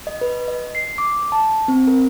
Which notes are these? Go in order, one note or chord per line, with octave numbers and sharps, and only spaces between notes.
D#5
B4
D#5
C7
D6
A5
C4
A#4